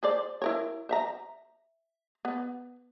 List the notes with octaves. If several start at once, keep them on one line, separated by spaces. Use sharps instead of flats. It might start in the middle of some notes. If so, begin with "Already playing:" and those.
G#4 C5 D5
E4 A#4 C#5
C5 E5 A#5
B3